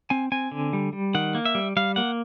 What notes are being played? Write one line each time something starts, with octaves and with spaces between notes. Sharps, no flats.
C4 G#5
C4 G#5
D3
G3
G3
D#3 F#5
A#3
E5
G3
G3 F5
A#3 F#5